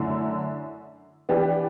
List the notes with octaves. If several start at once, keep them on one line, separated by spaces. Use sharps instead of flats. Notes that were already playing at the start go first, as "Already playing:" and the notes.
Already playing: F#2 D3 A3 E4
E3 B3 D4 G4